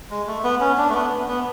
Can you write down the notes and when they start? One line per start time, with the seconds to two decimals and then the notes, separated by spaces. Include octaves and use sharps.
0.10 G#3
0.27 A3
0.44 B3
0.60 C#4
0.78 D4
0.89 A3
0.94 B3
1.28 B3